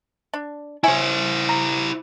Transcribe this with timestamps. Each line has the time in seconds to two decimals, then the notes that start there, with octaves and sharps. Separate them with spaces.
0.33 D4
0.84 E4 C5 C#5 E5 G#5
1.49 A#5